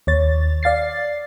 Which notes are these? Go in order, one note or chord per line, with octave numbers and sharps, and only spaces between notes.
D#2 C#5 A6
D5 F5 A6 C7